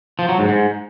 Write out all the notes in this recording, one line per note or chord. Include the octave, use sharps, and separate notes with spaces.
F3
F#3
G#2
G#2